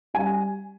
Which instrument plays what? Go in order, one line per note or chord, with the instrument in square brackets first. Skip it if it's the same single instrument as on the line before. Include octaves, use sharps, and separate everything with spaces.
[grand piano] G3 G#5